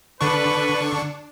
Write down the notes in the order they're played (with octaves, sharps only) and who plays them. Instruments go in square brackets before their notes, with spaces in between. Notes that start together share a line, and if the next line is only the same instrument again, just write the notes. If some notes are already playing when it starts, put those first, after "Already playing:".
[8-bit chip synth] D3 C#6 [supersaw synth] D4 [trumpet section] B4